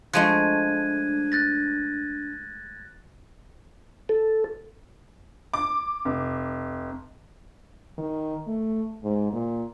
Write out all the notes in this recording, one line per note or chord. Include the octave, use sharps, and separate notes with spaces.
F3 G#3 A3 D4 F#6 G#6 D#7
F#6 A6 A#6
A4
D6
F1
D#3
A3
G#2
A#2